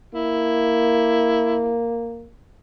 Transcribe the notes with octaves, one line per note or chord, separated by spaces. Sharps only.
A#3 E4